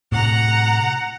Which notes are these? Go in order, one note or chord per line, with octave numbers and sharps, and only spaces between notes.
A2 C3 F#5 A#5